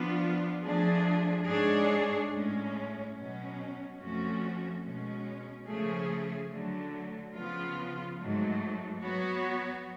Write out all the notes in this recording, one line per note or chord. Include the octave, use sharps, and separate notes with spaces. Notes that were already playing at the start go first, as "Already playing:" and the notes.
Already playing: F3 B3 D4 F4
F3 A3 D4 G#4
G#2 G#3 D4 G#4 C#5
A2 G#3 C#4
B2 F#3 C#4
F2 F3 A3 C#4 F#4
B2 G#3 C#4
C#3 F3 A3 C#4 G#4
D3 F#3 A3
C#3 F3 B3 F4
G#2 F#3 A3
F#3 B3 F#4 C#5